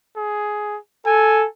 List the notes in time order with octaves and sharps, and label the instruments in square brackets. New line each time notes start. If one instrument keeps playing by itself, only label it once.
[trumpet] G#4
[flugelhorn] A4 [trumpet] G#5